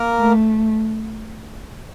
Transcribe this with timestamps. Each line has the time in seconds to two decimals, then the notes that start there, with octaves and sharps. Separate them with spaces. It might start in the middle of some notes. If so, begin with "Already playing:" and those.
Already playing: A#3 A#4
0.20 A3